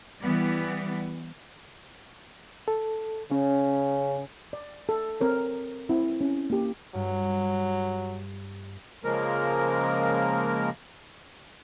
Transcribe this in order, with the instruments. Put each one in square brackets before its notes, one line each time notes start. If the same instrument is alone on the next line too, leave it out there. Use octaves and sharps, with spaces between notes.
[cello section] E3 G3 B3
[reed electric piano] A4
[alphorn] C#3 [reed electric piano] C#4
[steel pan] D5
A4
C4 A#4 C#5
C4 E4
C#4
A#3 G4
[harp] G2 [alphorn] F#3
[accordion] C#3 F3 G#3 A#3 A#4